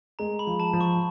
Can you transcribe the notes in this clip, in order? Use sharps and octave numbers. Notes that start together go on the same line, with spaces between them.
G#3 A#5
B5
F3
A5
F3
C#6